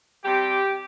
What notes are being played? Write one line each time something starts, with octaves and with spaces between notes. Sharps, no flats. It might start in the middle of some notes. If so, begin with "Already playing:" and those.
C3 G3 G4